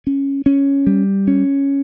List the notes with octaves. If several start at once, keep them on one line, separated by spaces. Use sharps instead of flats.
C#4
C#4
G3
C#4